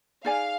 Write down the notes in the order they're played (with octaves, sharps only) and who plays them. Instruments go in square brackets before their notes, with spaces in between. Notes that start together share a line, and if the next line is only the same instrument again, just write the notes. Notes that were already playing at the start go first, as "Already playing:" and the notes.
[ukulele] D#4 G#4 D5 G#5 [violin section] F5